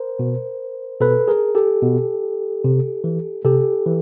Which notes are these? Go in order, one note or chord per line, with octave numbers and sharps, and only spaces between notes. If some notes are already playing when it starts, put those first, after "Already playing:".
Already playing: A#4 C5
B2
B2 A4 B4
G#4 A#4
G4 A4
B2
C3
E3
C3 G4 A4
E3